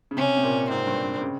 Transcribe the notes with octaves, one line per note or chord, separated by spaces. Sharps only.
C#3
C3 C#4
C3
A#2
G#2 C4
G2
G2
C#3